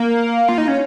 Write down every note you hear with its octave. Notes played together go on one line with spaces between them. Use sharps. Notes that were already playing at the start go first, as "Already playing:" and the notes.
Already playing: A#3
F4
D#4
C#4